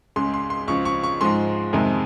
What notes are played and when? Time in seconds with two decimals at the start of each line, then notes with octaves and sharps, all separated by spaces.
0.16 C#2 C#3 G#3 C6
0.34 C6
0.50 C6
0.68 C#2 C#3 F3 C#6
0.85 C#6
1.03 C#6
1.21 G#2 F3 G#3 C6
1.73 F2 C3 D#3 G#3